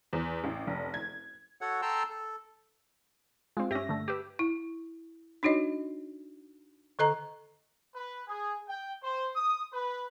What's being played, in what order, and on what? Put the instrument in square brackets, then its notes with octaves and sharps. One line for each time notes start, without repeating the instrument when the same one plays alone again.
[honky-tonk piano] E2
A1
F1
G#6
[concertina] F#4 A4 C#5 F#5
A4 G5 A5 A#5 C6 E6
A4
[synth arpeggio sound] G#3 C4 [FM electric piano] F4
[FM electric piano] G2 E5 A#6 [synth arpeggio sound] C#4 G4
[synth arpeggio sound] D3 A3
[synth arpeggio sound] G4 B4 [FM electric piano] D6 E6
[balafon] E4
D4 D#4 F#4 C#5 D#5
D3 A4 D#5 A#5
[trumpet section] B4
G#4
G5
C5
D#6
B4